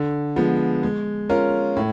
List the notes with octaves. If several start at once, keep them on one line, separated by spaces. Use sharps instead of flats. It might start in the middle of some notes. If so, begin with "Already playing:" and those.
Already playing: D3
F3 G#3 B3
G#3
C#4 F4 A#4
A2